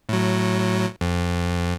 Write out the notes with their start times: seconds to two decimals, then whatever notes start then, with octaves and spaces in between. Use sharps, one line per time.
0.09 A2 F#3
1.01 F2